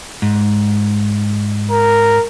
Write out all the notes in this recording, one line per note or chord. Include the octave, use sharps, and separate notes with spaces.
G#2
A#4